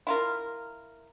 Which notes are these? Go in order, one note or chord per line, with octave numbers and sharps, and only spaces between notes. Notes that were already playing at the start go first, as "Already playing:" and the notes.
E4 F4 A#4